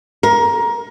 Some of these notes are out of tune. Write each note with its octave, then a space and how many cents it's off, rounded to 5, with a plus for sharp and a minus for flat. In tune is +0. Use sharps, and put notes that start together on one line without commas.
A#4 +20